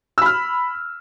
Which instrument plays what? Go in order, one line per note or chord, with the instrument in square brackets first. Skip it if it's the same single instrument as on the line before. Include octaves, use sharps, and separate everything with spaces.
[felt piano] E6
B5
F6